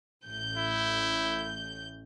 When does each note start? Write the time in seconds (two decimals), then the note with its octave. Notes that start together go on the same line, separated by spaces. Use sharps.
0.24 A1 G6
0.57 E4